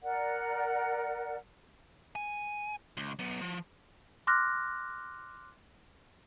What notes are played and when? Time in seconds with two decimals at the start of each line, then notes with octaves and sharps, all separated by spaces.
0.02 A#4 D5 F#5
2.15 G#5
2.97 C#2
3.19 F#3 B3
3.41 F3
4.27 C6 D6 F6 F#6 A#6